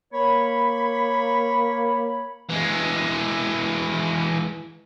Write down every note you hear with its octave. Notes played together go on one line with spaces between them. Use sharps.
A#3 C#5 B5
E3 G#3